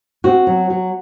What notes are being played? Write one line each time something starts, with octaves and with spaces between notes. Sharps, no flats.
C4 F#4
F#3
F#3